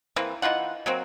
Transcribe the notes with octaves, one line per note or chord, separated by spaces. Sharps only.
E3 A#3 C4
E3 D#4 F4 F#5
F#3 A#3 C4